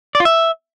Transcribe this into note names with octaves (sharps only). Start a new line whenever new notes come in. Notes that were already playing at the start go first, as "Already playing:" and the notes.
D5
F4
E5